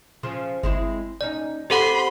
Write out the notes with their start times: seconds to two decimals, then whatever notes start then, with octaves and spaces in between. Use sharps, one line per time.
0.23 C#3 F3 F4
0.63 G1 G#3 C4 E4
1.21 D#2 C#4 D#4 D5
1.70 C4 G4 A4 F#5 B5 C6